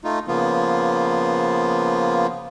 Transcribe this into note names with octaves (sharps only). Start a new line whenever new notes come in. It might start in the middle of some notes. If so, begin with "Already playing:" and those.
A3 D#4 F4
C#3 F3 A#3 B3 F4